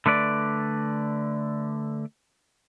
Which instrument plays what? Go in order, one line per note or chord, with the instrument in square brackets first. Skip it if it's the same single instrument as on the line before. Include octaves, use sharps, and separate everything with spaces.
[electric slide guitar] D3 A3 B4 D5